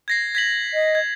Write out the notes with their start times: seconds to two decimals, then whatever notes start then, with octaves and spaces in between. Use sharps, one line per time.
0.08 G#6 A#6 C7
0.35 G#6 B6 F#7
0.74 D#5
0.95 G#6